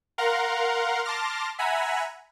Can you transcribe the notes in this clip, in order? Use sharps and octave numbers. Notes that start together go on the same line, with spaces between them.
A#4 F5 F#5 A#5 C6
A5 C6 D6 F6 A#6
E5 F#5 G#5 A#5 B5